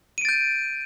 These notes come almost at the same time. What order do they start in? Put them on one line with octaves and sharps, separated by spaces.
D#7 D7 A6 G6